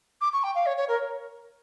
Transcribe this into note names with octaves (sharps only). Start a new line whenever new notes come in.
D6
C#6
G5
F5
C#5
C#5
A#4